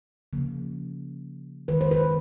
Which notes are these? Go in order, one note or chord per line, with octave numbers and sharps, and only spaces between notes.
C#3 F3 A#3
D#3 G#3 B4
C5
B4